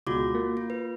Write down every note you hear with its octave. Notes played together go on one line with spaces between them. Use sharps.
C#2 B2 G#3 F4 F#4 D6
A#3
F4
B4